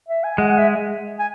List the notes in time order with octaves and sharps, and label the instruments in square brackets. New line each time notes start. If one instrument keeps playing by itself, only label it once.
[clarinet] E5
G#5
[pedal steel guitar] G#3 [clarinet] F#5
[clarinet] F#5
E5
G#5